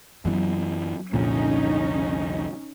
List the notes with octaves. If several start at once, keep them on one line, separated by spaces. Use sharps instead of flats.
F#2 E3 F#3 B3
C2 F2 A#2 D3 C#4 D#4